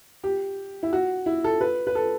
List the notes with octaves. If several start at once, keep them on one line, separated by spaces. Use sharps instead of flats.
G4
E4
F#4
E4
A4
B4
B4
A4